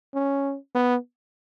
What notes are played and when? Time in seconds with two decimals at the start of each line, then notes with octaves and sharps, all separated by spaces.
0.14 C#4
0.75 B3